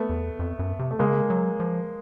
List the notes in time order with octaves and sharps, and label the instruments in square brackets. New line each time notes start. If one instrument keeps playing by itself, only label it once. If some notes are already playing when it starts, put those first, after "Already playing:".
Already playing: [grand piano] A3 B3
[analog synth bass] E2
F2
F#2
C3
[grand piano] A3
[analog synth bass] C#3 [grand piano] G#3 A#3
[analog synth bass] F#3
F3